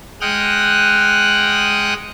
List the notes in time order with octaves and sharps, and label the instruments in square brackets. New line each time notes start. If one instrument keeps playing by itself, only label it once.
[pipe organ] G#3 F#5 G5 D#6 F6 F#6